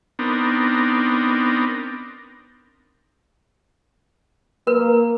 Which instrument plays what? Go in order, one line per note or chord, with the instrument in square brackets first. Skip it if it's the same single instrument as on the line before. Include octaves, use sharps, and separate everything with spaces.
[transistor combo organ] B3 C4 D4 D#4 A#4
[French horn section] A#3 [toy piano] A#4 B4